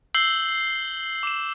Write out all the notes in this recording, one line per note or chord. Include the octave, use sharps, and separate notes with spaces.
E6 G6 C7 F#7 G7
D6 E7